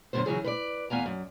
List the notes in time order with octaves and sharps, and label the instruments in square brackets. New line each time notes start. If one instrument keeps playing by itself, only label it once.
[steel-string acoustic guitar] F#2 B2 D3 F#3 B3 C5
C#3 E3 F#3 G#4
B4 C#5 D5
E2 B3 F5 G#5 A#5
F#2